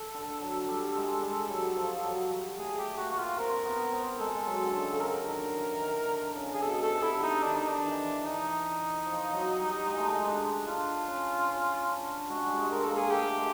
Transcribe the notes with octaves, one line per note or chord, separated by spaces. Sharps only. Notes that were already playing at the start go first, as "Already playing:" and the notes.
Already playing: A4
D3
F#3
G3
G#3
G3
F#3
F3
F3
F#3
G3
A3 G#4
G4
A#3 F#4
F#4
F4
C4 A#4
B3
C4
G#3 A4
F#3
D3
C#3
A4
D3 A#4
D#3
E3
D#3
D3
C#3
G#4
B2 A4
A4
C3
E4
D3
D#4
D#3 D4
D#4
D4
E3
D#4
F3
F#3
G3
G#3
A3
G#3
D4
D4 F4
C#4
C#4
D4
G#3 F#4
G3
G#3
A#4
A#3 A4
G#4
A3 G4
G#3